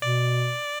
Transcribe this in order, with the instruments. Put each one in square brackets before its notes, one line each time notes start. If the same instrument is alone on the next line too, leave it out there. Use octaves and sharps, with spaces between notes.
[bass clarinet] B2 [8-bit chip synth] D5